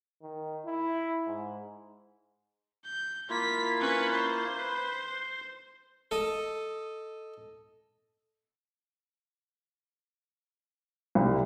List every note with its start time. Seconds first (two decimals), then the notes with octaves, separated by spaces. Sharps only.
0.22 D#3
0.66 E4
1.27 G#2
2.85 G6
3.30 A#3 E4 F4 B6
3.80 C#4 B4
4.12 C5
4.57 B4
5.07 C6
6.11 A4 D#5
11.15 C2